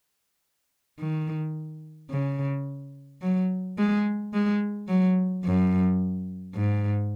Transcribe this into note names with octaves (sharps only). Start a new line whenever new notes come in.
D#3
C#3
F#3
G#3
G#3
F#3
F#2
G#2